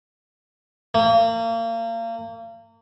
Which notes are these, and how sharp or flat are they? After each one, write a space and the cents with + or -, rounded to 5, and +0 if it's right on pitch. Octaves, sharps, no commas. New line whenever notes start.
A#3 -35